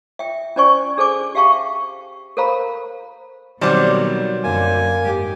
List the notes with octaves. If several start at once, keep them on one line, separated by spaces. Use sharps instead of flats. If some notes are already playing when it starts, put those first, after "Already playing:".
E5 G5
C#4 D4 C5 D5 G#5 C#6
D4 G#4 A4 C5 G#5 D6
G4 E5 F5 G5 A5 C#6
A4 A#4 C5 F5 A#5 B5
B2 D#3 F#3 G3 C4 C5 D5
F#2 D3 A#3 G#5
G#2 G4